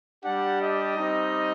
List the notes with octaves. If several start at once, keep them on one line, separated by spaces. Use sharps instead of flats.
G3 D4 G4 F#5
D#5
G3 C4 D#4